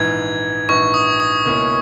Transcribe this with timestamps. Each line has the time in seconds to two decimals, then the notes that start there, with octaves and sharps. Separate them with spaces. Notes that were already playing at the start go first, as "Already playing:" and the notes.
Already playing: A#1 G#2 E3 G#6
0.69 A#1 G#2 E3 C#6
0.94 D#6
1.20 D#6
1.46 C#2 B2 A#3 C#4 E4